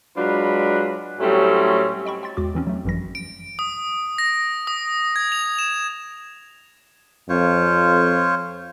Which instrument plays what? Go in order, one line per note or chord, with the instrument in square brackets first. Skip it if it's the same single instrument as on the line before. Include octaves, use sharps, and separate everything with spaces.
[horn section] F#3 G#3 D4 F4 B4 B5
A2 F#3 G3 A3 C4 C#4
[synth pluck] D#5 G5 B5 C#6
G5 C6 A6
E2 G#3 F#4 D6
E2 E3 C4 C#4
F#3 A3
G#1 F#2 E3 F3 G3 A#6
[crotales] D7
D#6
A#6
D#6
G#6
F7
E7
[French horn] F2 [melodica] F4 C5 C#5